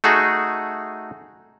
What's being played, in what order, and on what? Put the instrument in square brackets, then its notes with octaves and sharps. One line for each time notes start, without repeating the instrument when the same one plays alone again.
[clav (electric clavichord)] A3 D#4 F#4 G#4